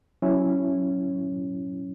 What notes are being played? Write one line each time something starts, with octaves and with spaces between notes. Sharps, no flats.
F#3 C#4 E4